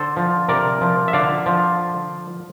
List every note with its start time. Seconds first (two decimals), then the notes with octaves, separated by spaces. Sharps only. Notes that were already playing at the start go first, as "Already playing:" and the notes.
Already playing: D3 A4 C5
0.16 F3
0.48 C3 A#4 D5
0.81 F3
1.08 E5
1.13 D3 D5 F5
1.46 F3